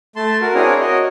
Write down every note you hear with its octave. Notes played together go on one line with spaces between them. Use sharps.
A3 A5 C6
F#4 A#4
C4 D4 E4 G#4 A#4 C#5
F#4 A#4 C#5 D#5